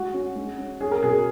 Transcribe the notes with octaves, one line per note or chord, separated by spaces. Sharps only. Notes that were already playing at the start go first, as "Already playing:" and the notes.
Already playing: G#3 F#4
C#4
G#3
C#4
C#4 G#4
A#4
B2 G#4